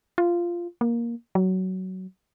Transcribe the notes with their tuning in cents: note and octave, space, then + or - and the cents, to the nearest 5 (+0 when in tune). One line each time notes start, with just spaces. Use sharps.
F4 -10
A#3 +10
F#3 +15